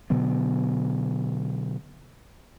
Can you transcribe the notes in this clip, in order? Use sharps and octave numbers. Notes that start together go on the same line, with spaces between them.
B2 D3 F#3 B3